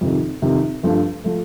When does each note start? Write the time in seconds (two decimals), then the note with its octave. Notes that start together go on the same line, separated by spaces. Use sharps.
0.01 F2 C3 D#3
0.42 F2 C3 D#3
0.83 G2 F3 A3
1.24 F3 A3